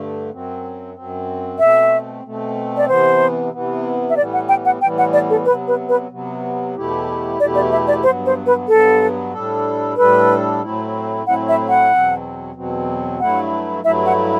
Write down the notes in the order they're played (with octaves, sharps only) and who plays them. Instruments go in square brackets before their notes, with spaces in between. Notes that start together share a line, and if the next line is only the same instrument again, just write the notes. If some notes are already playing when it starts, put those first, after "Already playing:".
Already playing: [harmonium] G2 D3 A3
F#2 F#3 C4
F#2 F#3 C4
[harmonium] B2 A3 C4 [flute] E5
[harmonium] B2 A3 C4
[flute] D5
[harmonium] C3 E3 B3 [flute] C5
[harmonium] C3 E3 B3
[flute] E5
[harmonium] A2 E3 G3 B3 [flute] D5
[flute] F#5
G5
F#5
[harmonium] A2 E3 G3 B3 [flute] G5
[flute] F#5
D5
A4
[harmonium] C3 F#3 B3 [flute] B4
[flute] B4
B4
[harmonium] C3 F#3 B3
E2 B2 A3 E4 G4
[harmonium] E2 B2 A3 E4 G4 [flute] D5
[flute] D5
E5
D5
[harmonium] G2 F#3 B3 [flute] C5
[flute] C5
B4
[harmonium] G2 F#3 B3 [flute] A4
[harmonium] A2 G3 D4 A4
[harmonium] A2 G3 D4 A4 [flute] B4
[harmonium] A2 F#3 A3 C4 E4
[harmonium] A2 F#3 A3 C4 E4 [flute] F#5
[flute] E5
F#5
[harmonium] E2 B2 F#3 C4
E2 B2 F#3 C4
[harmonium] G2 F#3 A3 E4 [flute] F#5
[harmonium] G2 F#3 A3 E4 [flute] E5
[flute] F#5